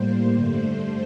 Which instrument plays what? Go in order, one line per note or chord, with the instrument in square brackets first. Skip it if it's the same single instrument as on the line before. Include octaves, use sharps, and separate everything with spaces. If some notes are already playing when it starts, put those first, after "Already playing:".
Already playing: [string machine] A2 G3 A#3 C5
G2 D3 A3